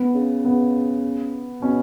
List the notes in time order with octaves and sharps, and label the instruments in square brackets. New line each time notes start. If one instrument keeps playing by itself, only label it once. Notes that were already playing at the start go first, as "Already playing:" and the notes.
Already playing: [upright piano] B3
[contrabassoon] C#3
[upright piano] B3
[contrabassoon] B2 [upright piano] C#4